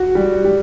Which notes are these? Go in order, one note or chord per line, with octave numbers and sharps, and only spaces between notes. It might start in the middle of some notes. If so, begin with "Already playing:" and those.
Already playing: F#4
G3
G3